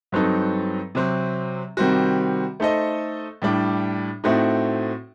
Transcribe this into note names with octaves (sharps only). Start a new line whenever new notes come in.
G2 F#3 C4 D#4 A4
C3 F#3 C4
C3 D#3 G3 C4 F#4
A3 D#4 A4 C5 D#5
A2 G3 D4
A2 A3 C4 D#4 F#4